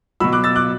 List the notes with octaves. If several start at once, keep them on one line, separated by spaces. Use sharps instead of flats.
B2 F#3 B5 E6
D6 F#6
E6 A6
D6 F#6